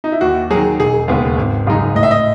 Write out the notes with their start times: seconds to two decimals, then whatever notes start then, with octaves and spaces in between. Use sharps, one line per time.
0.04 D#4
0.12 E4
0.21 D#2 F#4
0.50 D#3 F#3 G#4
0.79 E1 G#4
1.08 D#2 C#3 G#3 B3
1.37 G#1
1.67 F#2 C#3 G#3 D#4
1.95 A2 D#5
2.03 E5
2.11 D#5